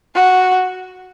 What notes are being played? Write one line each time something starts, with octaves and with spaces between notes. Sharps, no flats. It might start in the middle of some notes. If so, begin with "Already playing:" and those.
F#4